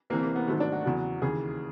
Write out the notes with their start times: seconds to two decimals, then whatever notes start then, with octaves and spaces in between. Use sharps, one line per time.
0.10 C2 C3 E3 A#3
0.23 A#3
0.36 B3
0.48 G#2 D#3 F#3 A3
0.60 D4
0.72 F#4
0.85 E2 C#3 F#3
1.22 D#2 C#3 E3 G#4